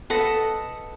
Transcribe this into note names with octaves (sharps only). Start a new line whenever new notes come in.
A4 B4 D#5 F#5